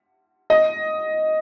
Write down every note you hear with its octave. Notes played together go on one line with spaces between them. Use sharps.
D#5